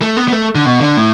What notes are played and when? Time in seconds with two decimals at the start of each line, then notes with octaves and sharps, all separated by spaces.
0.02 A3
0.17 B3
0.28 B3
0.32 A3
0.55 D3
0.66 B2
0.81 D3
0.97 A2